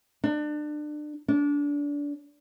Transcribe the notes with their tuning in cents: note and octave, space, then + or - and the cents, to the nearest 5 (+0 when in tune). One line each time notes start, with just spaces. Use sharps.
D4 +30
D4 -25